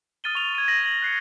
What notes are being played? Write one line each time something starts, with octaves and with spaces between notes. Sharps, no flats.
D#6 F6 A6 D#7 G7
C#6 F7
G#6 D#7
A#6 F#7
A#6 F#7
F#6 C7 C#7